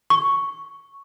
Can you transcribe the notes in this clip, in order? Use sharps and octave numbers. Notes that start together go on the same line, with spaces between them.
C#6